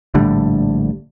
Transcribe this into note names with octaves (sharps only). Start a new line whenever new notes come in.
A#1 A2 D3 G3